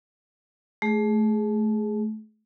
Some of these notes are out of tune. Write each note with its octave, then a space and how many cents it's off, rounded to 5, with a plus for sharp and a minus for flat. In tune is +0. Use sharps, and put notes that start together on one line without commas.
A3 -25 G#4 +0